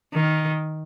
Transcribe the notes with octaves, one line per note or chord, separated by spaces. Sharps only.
D#3